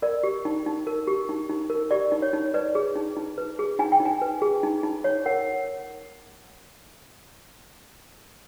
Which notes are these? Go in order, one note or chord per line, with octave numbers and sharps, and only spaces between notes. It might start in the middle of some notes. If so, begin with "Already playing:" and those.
A#4 D5
G4
D#4
D#4
A#4
G4
D#4
D#4
A#4
G4 D5
D#4
C#5
D#4
B4 D5
G#4
D#4
D#4
B4
G#4
D#4 G#5
G5
D#4
G#5
B4
G#4
D#4
D#4
C#5
A#4 F#5